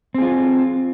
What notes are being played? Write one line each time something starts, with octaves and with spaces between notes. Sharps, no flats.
C4 F4 G#4